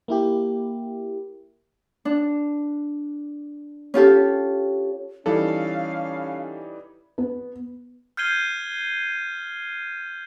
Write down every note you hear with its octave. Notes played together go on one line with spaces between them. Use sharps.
A#3 E4 G4
D4
C#4 F4 G4 A4
E3 G3 C#4 D#4 A4 F5
B3
F6 G6 G#6 C7 D#7 G7